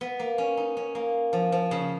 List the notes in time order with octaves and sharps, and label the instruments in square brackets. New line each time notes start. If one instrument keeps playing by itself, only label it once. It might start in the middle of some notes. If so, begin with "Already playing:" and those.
[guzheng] B3
A#3
C#4
D#4
C#4
A#3
F3
F3
C#3